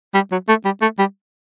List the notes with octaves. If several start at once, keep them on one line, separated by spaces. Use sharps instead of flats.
G3
F#3
A3
G3
A3
G3